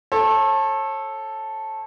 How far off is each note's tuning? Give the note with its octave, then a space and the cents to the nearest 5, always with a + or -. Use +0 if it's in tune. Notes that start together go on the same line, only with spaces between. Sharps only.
A4 -5 C#5 -40